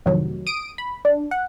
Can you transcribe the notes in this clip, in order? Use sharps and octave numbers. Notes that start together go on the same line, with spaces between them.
F2 A2 C3 D#3 F#3
D#6 D7 D#7
B5
D4
F#5